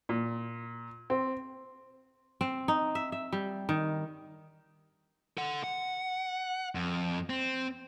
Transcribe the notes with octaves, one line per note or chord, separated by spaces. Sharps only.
A#2
C4
C4
D#4
E5
E5
G3
D#3
A4 F#5
F#5
F2
C4